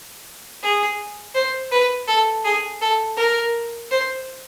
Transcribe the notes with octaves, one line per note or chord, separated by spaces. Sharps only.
G#4
C5
B4
A4
G#4
A4
A#4
C5